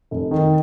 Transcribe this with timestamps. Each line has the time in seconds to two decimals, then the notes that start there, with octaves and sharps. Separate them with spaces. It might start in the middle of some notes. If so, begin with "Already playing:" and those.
0.11 F1
0.31 D#3